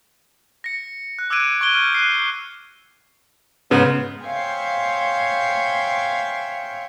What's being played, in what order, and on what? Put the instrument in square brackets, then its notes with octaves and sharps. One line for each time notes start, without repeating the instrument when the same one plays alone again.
[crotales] A#6 C#7
F#6
D6 E6 F#6 G#6 D7 D#7
C#6 G#6 D7 G7
F6 G6
F#6 C7 D#7
[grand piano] G#2 C#3 [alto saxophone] B3
[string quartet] C5 C#5 E5 F5 G5 G#5